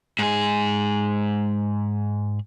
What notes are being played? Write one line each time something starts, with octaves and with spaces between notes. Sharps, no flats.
G#2 G#4